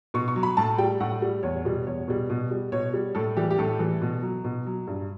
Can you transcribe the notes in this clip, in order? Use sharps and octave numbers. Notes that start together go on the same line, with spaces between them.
B2 C#6
C#6
F#3
B5
A2 A5
G3 G5
A2 F#5
G3
E2 C#5
B2 G3
E2 C#5
B2 G3
B2
G3
B2 C#5
G3
A2 A4
E3 G3 G4
G4
A2 A4
E3 G3
B2
F#3
B2
F#3
G2